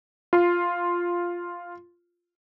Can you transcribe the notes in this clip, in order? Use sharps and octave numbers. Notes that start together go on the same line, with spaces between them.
F4 C6